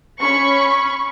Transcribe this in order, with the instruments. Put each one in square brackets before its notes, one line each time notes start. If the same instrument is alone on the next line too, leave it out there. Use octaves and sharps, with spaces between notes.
[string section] C#4 B5 C#6